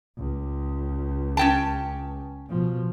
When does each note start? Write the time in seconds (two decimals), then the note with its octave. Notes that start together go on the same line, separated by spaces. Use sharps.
0.18 C#2
1.37 C#4 G5 A5
2.50 B2 F3